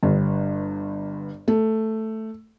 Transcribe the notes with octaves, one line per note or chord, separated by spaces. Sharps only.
G1 G2
A3